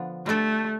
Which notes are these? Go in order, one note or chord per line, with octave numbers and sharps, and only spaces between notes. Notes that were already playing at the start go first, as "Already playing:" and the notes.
Already playing: D3 F3 B3 D4
G3 A3 D4 A4